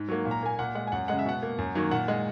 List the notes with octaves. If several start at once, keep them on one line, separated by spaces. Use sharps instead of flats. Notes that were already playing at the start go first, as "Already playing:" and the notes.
Already playing: G#2
F#3 A#3
A#2
A#5
A#3 G#5
A#2 F#5
G#3 F#5
G#5
F#2 F#5
C#3 G#3 F#5
E5
B2 F#5
A#3
F#2
D#3 F#3 A#3
A#2 F#5
G#3